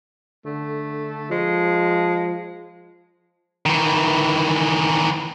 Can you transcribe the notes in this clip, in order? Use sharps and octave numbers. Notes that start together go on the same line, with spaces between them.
D3 A3
F3 G#3
D#3 E3